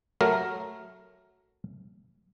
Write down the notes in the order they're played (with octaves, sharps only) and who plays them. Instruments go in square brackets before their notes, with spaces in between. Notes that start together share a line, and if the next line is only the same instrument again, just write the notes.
[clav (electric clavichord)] F#3 A3 A#4